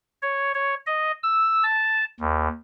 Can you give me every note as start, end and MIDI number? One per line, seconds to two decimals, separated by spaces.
0.22 0.52 73
0.54 0.75 73
0.86 1.11 75
1.23 1.63 88
1.63 2.04 81
2.20 2.48 39